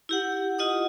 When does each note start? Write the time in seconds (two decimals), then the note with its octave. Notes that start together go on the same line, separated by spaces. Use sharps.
0.09 E4 G4 F#5
0.59 F4 D#5 F#5 D#6